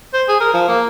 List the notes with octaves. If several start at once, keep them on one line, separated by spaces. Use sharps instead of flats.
C5
G#4
A#4
F3
A#3